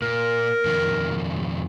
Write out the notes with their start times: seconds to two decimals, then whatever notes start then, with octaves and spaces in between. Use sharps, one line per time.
0.02 A#2 A#4
0.65 F2 B2 D#3